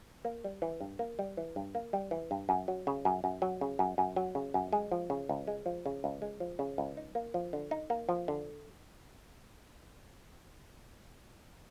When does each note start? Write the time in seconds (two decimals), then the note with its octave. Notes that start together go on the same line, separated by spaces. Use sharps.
0.25 A#3
0.44 G3
0.62 E3
0.81 G2
0.99 A#3
1.19 G3
1.37 E3
1.56 G2
1.75 A#3
1.93 G3
2.11 E3
2.31 G2
2.49 F#2
2.68 F#3
2.87 C#3
3.05 F#2
3.24 F#2
3.42 F#3
3.61 C#3
3.79 F#2
3.98 F#2
4.16 F#3
4.35 C#3
4.54 F#2
4.73 G#3
4.92 F3
5.10 C#3
5.29 C#2
5.47 G#3
5.66 F3
5.86 C#3
6.04 C#2
6.22 G#3
6.40 F3
6.59 C#3
6.78 C#2
6.97 D#4
7.15 A#3
7.34 F3
7.53 D3
7.71 D#4
7.90 A#3
8.09 F3
8.28 D3